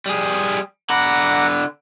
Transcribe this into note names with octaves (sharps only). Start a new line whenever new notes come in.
G3 G#4
D3 F#5 A#5 B5 D6